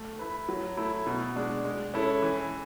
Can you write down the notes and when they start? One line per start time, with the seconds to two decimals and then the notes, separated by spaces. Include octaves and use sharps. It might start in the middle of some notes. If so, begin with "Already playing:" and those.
Already playing: A3
0.19 E4 B4
0.49 F#3
0.77 A3 E4
1.06 B2
1.36 G#3 D4
1.65 G#3
1.94 C#4 E4 A4
2.22 E3